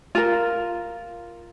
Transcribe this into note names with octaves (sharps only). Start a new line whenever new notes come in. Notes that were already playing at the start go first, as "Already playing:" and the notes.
F4 A#4